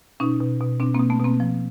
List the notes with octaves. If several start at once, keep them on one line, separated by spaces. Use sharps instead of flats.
B2 C#4 D#4
B2
B2
B2 C4 D4
A#3 C4
B2
A3 B3
B2
A#3 C4
F3